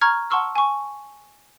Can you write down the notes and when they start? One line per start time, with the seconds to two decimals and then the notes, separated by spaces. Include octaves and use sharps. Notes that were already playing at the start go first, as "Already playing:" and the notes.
0.01 A#5 C#6 F6 G#6
0.30 F#5 A5 C6 C#6 E6 F6
0.55 G#5 C#6